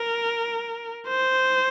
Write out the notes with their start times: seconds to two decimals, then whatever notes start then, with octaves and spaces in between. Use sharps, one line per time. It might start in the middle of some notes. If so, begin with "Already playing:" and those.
Already playing: A#4
1.08 C5